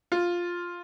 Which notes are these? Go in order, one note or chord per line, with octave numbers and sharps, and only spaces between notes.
F4